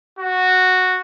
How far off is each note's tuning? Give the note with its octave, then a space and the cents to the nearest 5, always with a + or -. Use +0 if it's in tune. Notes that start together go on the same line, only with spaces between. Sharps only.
F#4 -5